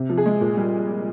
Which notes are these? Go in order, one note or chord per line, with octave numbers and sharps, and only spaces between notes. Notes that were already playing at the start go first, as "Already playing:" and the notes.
Already playing: C3
F3
G#4
G#3
A#2
G3